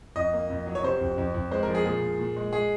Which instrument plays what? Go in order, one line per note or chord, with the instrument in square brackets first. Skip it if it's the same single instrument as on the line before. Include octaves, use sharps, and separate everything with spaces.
[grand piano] F2 D#5
A#3
F2
F#3
C#5
C3 C5
F2
F2
F2
G#3 C5
A#4
F3
G#4
A#2 G#4
A#2
A#2
G#3
G#3 G#4